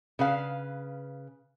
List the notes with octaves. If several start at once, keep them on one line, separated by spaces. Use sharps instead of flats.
C#3 B4 F5